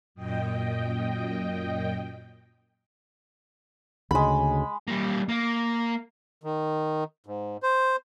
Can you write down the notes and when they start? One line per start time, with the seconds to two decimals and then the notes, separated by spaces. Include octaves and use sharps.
0.15 F#2 A#2 D#5 G5
4.11 D2 C#3 G#3 B5
4.88 G3 A#3
5.29 A#3
6.44 D#3
7.26 G#2
7.63 C5